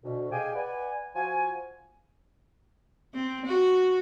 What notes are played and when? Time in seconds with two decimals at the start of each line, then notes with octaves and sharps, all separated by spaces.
0.04 D2 B2
0.32 G4 G#4 D#5 F5 G5 G#5
0.55 B4 D5 F#5 G#5
1.15 F3 F4 F#4 C5 G#5
3.14 C4
3.46 F#4